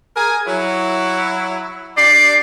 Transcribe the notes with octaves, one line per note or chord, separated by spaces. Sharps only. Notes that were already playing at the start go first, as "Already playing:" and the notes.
G#4 A#4 G#5
F#3 E4
D4 G4 D5 C7